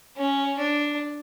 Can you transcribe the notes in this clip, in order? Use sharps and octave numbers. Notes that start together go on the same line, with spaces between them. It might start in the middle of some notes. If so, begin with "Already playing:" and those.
C#4
D4